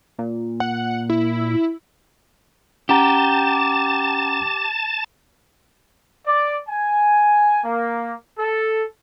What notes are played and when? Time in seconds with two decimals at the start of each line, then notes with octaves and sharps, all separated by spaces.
0.19 A#2
0.60 F#5
1.10 E4
2.89 C#4 G4 F#5 A5 A#5
6.27 D5
6.69 G#5
7.64 A#3
8.38 A4